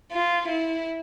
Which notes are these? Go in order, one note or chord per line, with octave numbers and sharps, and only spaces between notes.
F4
E4